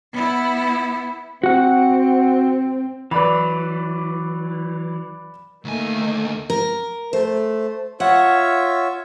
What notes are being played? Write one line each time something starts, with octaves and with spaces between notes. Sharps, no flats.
B3 E4
C4 F#4 F#5
E3 F#3 B4 D5 B5
D2 D#3 A3 A#3 G#5
A#4
A3 C5
F4 C#5 E5 F#5